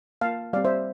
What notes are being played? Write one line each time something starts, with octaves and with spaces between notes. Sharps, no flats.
A#3 F4 F5 A5
G3 C4 G4 D5 F5
C5 E5